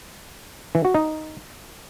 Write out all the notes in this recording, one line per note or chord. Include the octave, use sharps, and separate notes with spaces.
E3
F#4
D#4